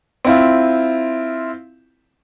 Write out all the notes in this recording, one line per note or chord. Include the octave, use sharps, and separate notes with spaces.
C4 E4 F4